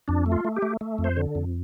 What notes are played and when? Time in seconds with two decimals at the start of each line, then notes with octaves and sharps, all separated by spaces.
0.08 F2 D4
0.26 A3
0.32 F4
0.45 A3
0.56 G4
0.62 A3
0.81 A3
0.98 F2
1.04 C5
1.17 D3
1.35 F2